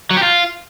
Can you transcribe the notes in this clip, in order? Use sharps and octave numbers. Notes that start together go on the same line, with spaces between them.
F#3
G4
F4